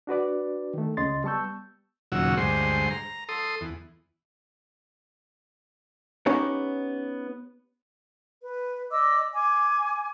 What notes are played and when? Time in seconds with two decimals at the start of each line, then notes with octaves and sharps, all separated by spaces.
0.07 D4 F#4 B4 D5
0.74 D#3 A3
0.97 C#2 C#3 D#5 C6 A6
1.24 G3 B3 A5 C#6 E6 G6
2.12 D#2 A#2 C#3 F#3 F#4 E6
2.37 D2 G2 G#3 C5 C6
2.90 A#5
3.29 A4 C6 D#6
3.61 E2
6.26 B3 C#4 D#4 G4 C#5
8.42 B4
8.91 D5 D#5 D6 E6
9.33 G#5 D6